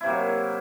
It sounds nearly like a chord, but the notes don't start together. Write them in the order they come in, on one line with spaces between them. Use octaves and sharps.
E4 C3 A#3 F#3